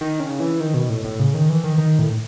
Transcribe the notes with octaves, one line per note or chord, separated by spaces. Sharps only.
D#3
C#3
E3
D#3
B2
A2
A2
C#3
D#3
E3
D#3
D#3
A2